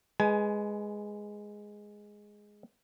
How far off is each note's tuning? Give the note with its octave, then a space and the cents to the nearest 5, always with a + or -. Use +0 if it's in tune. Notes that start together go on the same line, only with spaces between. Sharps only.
G#3 +0 B4 +0 G#5 +25